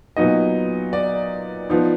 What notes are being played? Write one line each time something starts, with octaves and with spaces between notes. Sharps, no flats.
A#2 F#3 B3 D#4 D#5
D5
F3 B3 D#4